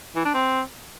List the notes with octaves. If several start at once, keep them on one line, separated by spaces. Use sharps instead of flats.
E3
D4
C4